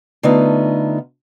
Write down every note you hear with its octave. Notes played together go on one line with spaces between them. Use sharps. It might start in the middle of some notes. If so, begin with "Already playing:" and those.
D3 A3 B3 D#4 F4